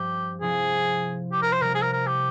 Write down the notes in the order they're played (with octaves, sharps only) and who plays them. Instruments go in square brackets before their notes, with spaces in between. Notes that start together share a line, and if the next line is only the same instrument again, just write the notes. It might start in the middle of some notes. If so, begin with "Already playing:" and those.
Already playing: [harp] G2 F3 C4 [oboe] G4
[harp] C3 F3 C4 E4 [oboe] G#4
[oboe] G4
A#4
C5
[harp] C3 G3 A#3 [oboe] A#4
[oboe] G#4
A#4
A#4
G4